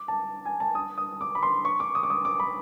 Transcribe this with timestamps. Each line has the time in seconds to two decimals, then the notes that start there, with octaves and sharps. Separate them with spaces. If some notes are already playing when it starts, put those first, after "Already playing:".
Already playing: D6
0.08 A5
0.45 G#5
0.60 A5
0.75 D#6
0.98 D#6
1.21 D6
1.35 B5
1.43 C6
1.65 C#6
1.80 D6
1.95 D#6
2.03 D6
2.10 D#6
2.25 D6
2.40 B5